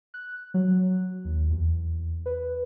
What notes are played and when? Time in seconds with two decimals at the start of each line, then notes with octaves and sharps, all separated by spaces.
0.14 F#6
0.54 F#3
1.25 D#2
1.50 E2
2.26 B4